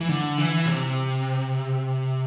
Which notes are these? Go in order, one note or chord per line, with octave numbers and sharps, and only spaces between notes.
E3
D3
E3
C3